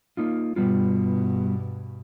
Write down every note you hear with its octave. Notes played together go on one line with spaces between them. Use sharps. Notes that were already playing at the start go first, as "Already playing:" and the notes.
A#3 D#4 F4
G2 B2 G3 B3 F4